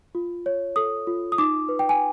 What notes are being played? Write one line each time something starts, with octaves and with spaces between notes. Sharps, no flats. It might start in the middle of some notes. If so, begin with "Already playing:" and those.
F4
C#5
A4 D#6
F4
D#6
D#4 D6
B4
G5
G#5